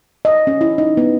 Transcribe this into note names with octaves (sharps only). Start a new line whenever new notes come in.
D#5
C#4
E4
D#4
B3